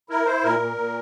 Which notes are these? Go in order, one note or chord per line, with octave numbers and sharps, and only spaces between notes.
E4 A#4
E4 C5
A#2 A#4
A#2
A#2